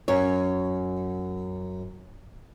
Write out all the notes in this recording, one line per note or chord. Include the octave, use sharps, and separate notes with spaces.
F#2 C#5